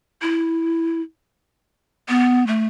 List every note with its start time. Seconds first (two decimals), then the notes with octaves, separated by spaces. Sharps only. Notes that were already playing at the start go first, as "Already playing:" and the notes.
0.22 E4
2.09 B3
2.47 A3